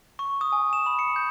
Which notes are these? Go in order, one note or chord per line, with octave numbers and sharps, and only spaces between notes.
C#6
D#6
G#5
E7
B5
C#7
G6